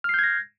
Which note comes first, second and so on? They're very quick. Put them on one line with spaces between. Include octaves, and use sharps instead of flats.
F6 C7 G6 G#6 A#6